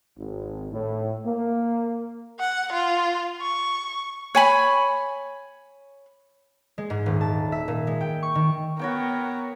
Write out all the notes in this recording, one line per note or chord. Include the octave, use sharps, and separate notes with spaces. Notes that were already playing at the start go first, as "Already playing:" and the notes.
G#1
A2
A#3
F#5
F4
C#6
C#5 G#5 B5 C#6
G#3
G#2
D#1
A5
E5
A#2
G#3
G5
C#6
D#3
B3 F#4 A#4 C#5 G5